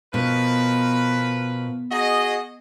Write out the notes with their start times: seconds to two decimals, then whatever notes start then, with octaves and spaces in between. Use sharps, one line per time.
0.14 B2 F3 A#4 B4
1.91 F#4 G#4 D#5